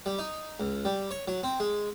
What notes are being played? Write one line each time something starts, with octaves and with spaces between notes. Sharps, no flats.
G3
D#4
C#2
G3
C#5
F#3
C4
G#3